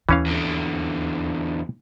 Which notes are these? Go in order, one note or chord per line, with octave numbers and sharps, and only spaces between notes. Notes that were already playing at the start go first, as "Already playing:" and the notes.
D#2 E3 C#4 F5
E2 D3